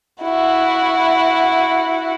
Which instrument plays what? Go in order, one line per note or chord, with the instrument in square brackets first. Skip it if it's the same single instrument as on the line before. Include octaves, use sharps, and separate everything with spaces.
[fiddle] E4 F#4